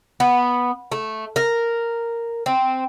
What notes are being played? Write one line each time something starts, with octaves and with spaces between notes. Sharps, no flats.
B3
A3
A#4
C4